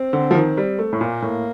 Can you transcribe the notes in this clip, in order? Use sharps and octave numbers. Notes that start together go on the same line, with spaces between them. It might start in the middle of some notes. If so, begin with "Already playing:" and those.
Already playing: C4
D3
F3
D#3
G3
A3
A2
A#2 A#3
A2